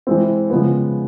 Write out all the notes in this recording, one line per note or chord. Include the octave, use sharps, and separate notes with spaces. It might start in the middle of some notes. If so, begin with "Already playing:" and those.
E3 G#3 C4
C#3 F3 G#3 B3